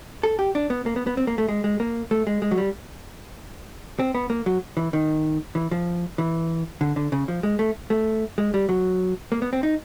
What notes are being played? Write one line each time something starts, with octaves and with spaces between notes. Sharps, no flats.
A4
G4
D4
B3
A#3
B3
B3
C4
A#3
A3
G#3
G#3
A#3
A3
G#3
G#3
F#3
G3
C4
B3
A#3
F#3
E3
D#3
E3
F3
E3
D3
D3
C#3
F3
G#3
A3
A3
G#3
G3
F#3
A#3
B3
C4
D#4